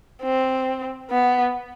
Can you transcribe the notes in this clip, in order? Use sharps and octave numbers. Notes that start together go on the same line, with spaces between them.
C4
B3